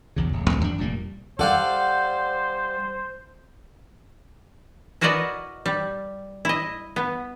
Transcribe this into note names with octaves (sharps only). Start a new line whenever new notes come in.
B1 E2 C#3
D1
C#2 F#3 C4
E2 D4
F1 A#2 G3 A#3
G3 A4 C5 D5 F5 F#5
E4 F#4 A#4 B4 D5 D#5
G3
E4 D#5
B3